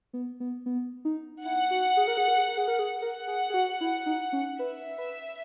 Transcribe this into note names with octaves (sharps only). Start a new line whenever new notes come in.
B3
B3
B3
D#4
E4 F#5
F#4
G#4
A#4
G#4
A#4
G#4
A#4
G#4
A#4
G#4
A#4 F#5
G#4
G#4
F#4
E4
D#4
C#4
B4 E5
B4